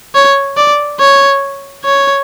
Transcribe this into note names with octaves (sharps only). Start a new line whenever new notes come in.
C#5
D5
C#5
C#5